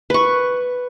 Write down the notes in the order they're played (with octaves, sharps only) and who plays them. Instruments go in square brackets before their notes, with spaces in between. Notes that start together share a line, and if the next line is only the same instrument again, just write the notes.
[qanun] B4 C#6